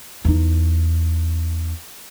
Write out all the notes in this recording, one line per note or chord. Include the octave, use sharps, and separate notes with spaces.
E2 D#4